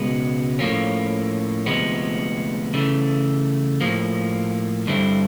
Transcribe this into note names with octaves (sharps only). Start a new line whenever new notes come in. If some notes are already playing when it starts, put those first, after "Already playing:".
Already playing: C#2 B2 G#3 B3
A2 F3 A#3 C#4
D2 C3 F3 G#3 B3
C#3 E3 A3
A2 F3 A#3
G2 D3 G3 C4 E4